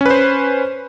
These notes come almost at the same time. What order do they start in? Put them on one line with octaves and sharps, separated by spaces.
C#4 B4 C5